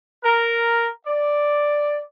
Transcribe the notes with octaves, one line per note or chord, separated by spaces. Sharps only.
A#4
D5